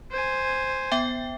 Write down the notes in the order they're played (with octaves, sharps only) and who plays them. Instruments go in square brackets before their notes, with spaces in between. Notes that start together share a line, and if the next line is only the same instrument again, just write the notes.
[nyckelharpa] C5 G#5
[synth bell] B3 E5 G5